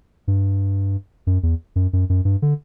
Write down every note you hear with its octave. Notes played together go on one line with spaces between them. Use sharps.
G2
F#2
E2
F#2
F#2
F#2
G2
D3